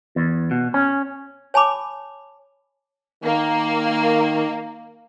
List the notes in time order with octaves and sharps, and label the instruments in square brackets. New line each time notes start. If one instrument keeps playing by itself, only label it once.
[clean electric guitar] E2
B2
C#4
[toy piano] C#5 G#5 A5 B5 D6
[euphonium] D#3 [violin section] A#3